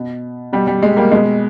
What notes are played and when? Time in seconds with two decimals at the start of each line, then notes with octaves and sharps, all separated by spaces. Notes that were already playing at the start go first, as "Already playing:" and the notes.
Already playing: B2
0.52 B2 G3
0.67 G3
0.82 G#3
0.96 G3 A#3
1.11 B2 G#3